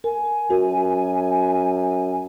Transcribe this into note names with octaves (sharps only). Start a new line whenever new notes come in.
A#4 G#5
F#2 F#4 A#4